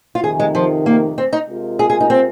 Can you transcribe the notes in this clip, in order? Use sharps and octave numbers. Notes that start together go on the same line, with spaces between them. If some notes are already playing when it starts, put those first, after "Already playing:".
F4
F2 C3 D#3 G#4
G#3
F3
A#3
C4
D#4
C3 G#3 F4 A#4
G#4
G#4
D#4
C4